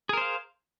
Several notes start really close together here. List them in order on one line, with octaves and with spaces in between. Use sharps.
G#4 A#4 C5 F5